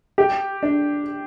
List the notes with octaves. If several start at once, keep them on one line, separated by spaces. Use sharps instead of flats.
G4
D4